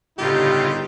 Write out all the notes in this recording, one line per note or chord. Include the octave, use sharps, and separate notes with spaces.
G1 A2 C#3 D#4 F4 G4